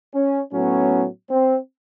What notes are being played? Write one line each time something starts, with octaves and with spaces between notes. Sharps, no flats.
C#4
A2 F#3 B3 C#4
C4